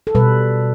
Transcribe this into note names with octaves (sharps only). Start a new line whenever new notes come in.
A4
B2 G3 B4